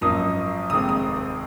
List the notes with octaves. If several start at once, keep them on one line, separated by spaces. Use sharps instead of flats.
G#1 F#2 F3 A#3 D#4 D#6
F1 D#2 D#3 G#3 C4 D#6
D#6